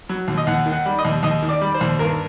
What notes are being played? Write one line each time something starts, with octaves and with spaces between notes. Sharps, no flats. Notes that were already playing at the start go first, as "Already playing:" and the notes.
F#3
D#2
D#5
D#2 F#5
D#3
F#5
G3
D#5
D#2
D#2 D#5
D#3
D5
G3
C5
D#2
G2 A#4